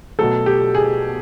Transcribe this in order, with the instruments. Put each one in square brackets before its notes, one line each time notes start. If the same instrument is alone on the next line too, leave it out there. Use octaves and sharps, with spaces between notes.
[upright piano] B2 F#3 A3 A4
G4
G#4